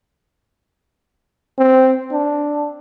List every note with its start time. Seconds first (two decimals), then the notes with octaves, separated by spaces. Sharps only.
1.58 C4
2.12 D4